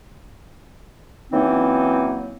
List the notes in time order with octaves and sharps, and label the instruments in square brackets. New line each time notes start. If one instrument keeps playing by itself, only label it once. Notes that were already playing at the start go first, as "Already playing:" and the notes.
[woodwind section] E3 F#3 A#3 C4 C#4 D#4